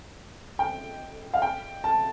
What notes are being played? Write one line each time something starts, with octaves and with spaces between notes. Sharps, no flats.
G5
F5
G5
A5